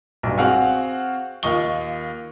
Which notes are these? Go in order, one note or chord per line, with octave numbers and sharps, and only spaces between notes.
B1 G2
C4 F#4 G#4 F5 F#5 G#5
D#2 F4 D#5 C#6 G7